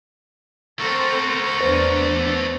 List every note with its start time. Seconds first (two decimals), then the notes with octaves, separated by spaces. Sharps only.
0.79 A3 C4 F#4 A4 A#4 C5 C#6
1.61 E2 B3 D4 B4 C5